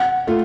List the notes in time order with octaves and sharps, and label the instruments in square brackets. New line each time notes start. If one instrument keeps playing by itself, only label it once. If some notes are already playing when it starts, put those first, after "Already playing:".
Already playing: [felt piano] F#5
[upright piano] A3 F4